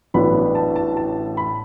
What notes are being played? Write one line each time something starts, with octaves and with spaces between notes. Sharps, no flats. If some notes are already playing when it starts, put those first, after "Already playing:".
A1 A2 F#3 B3 D4 B5
A5
A5
A5
B5